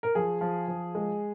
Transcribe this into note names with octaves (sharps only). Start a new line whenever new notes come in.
A#4
F3 G#4
F3
F3
G#3